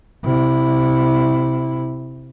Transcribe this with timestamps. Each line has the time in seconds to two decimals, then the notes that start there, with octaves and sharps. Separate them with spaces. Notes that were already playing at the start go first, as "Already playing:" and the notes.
0.23 C3 E4